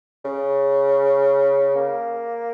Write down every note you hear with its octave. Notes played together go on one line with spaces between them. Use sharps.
C#3
A#3